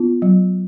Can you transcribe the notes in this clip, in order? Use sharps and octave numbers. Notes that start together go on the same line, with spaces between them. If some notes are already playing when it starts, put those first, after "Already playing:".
Already playing: B3 F4
F#3